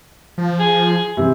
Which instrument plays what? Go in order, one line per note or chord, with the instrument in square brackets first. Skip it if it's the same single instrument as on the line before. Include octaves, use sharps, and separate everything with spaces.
[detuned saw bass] F3
[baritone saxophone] G#4
[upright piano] C3 E3